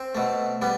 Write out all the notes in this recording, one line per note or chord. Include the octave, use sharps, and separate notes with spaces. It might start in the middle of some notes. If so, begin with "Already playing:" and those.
Already playing: C4
B2 A3
G3 B3